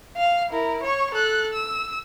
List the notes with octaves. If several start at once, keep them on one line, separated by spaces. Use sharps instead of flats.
F5
E4 A#4
C#5 C#6
A4 F#6
E6